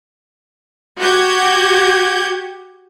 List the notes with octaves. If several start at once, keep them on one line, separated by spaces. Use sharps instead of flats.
F#4 G4 F#5 G6 G#6